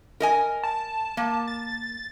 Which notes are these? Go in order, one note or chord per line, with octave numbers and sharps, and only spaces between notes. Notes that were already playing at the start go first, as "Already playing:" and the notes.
A#4 D#5 G#5
A5
A#3
A6